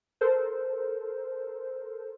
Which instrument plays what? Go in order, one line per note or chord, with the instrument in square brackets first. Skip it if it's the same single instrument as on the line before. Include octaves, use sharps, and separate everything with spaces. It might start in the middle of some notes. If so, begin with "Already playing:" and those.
[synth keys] A4 A#4 C5